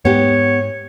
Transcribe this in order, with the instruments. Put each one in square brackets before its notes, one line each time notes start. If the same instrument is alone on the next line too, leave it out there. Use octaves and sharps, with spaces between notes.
[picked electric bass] G#2 [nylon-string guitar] B3 G4 [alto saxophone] C#5